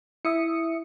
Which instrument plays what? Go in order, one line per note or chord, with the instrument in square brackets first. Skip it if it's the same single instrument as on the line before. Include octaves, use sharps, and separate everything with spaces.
[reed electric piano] E4 [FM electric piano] E5 D#6 C#7